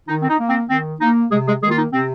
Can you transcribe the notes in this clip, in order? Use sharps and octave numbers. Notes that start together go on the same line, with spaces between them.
D#3 D#4
C4
D#4
A#3
C4
D#3 C4
A#3 D#4
C3 G#3 G#4
G#3 G#4
D#3 G#3 A#3 F4 G#4
D#4
C3 C4